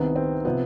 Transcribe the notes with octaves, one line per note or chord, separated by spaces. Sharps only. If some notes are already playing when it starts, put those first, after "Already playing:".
Already playing: C2 C3 D#3 B3
C4
C3 F3 B3